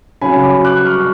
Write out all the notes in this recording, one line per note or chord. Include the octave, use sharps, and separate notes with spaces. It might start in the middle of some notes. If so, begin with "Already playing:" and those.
C#3 F#3 C#4 G#5 B5
B5 D6
D6 F#6
C#6 F6